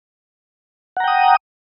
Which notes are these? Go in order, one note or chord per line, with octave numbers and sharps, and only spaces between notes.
F#5 G5 A#5 D#6